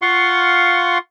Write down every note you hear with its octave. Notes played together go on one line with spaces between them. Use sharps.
F4 F5 F#5 C6 C#6